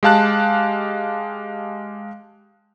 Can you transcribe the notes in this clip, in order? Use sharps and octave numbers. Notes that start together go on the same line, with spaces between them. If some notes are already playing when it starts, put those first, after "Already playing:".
G#3 G4 F5 A5 F#6